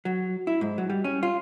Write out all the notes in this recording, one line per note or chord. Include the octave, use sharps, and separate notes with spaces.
F#3
E4
G#2
F#3
G3
C#4
F4